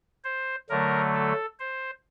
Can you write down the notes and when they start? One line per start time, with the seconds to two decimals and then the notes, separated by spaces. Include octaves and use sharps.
0.24 C5
0.70 D3 F#3 A3 A#4
1.14 A4
1.59 C5